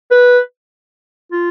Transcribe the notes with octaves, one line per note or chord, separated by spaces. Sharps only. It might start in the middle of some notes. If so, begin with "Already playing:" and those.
B4
F4